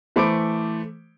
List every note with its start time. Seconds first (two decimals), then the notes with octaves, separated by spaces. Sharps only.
0.16 E3 A3 C5 B5 D6 D7